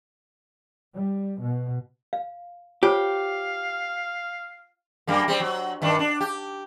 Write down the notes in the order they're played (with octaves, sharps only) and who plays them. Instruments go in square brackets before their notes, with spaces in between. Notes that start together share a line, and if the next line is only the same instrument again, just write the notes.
[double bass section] G3
B2
[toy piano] F5
[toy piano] F4 C5 C#5 [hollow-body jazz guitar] G4 [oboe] F5
[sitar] F#2 G3 A#3
G3 C4
F#3
G2 D#3 D4
D4
G4